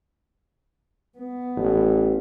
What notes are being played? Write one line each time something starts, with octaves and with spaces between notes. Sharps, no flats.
B3
A1